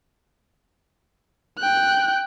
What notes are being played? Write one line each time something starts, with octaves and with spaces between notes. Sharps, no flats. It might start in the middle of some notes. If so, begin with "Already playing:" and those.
G5 F#6